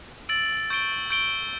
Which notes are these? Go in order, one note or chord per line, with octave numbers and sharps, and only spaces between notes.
E6 A6 D7 F#7
C#6 G6 D7 G7
C#6 G6 D7 G7